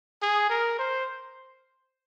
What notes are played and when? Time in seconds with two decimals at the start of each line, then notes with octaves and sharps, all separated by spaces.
0.22 G#4
0.50 A#4
0.79 C5